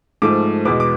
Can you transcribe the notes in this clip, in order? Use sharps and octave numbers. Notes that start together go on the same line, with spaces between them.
G#2 F3 A3 D6
E2 B2 G#3 B3 D6
D6